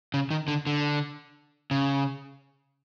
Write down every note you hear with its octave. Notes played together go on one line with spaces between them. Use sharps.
C#3
D#3
D3
D3
C#3